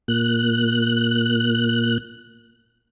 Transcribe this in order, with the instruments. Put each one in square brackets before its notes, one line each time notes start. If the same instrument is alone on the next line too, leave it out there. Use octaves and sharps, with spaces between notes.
[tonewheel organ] A#2 F#6